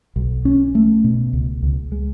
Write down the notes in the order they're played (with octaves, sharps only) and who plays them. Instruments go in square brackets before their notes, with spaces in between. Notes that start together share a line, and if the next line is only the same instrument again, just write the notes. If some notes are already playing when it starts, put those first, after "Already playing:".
[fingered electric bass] B1
C#4
A3
B2
C#2
C#2
G#3